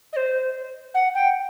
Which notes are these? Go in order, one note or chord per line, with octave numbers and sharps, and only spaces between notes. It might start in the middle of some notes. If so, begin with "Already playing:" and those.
D#5
C5
F#5
G5